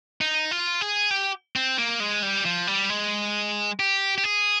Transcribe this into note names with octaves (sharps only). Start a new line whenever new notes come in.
D#4
F4
G#4
G4
C4
A#3
G#3
G3
F3
G3
G#3
G4
G4
G#4